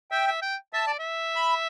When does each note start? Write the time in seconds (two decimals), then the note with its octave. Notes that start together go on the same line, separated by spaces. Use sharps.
0.11 E5 G5
0.27 E5
0.42 G5
0.73 E5 A5
0.87 D5
0.99 E5
1.35 B5